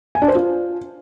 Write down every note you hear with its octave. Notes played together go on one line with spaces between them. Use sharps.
G#5
D4
C5
F4